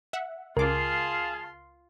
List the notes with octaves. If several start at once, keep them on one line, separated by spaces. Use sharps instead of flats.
E5 F#5
C#2 F4 G#4 A#4 F5 A5 C6 D6